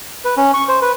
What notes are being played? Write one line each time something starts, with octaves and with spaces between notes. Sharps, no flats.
B4
C#4
C#6
C5
B4